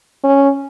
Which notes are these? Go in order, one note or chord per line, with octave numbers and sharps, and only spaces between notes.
C#4